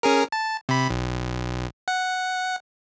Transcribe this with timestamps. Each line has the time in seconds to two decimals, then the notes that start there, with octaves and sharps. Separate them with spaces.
0.03 C#4 G#4 A#4
0.32 A5
0.69 C3 B5
0.90 B1
1.88 F#5